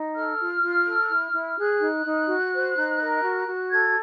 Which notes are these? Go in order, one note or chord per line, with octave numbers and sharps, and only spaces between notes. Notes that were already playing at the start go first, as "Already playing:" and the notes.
Already playing: D#4
A4 F6
F4
F4
A4
E4
E4
G#4 F#6
D#4
D#4
F#4
C5
D#4
A#4
F#4
F#4
A4 G#6